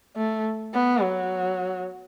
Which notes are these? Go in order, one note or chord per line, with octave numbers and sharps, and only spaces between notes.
A3
B3
F#3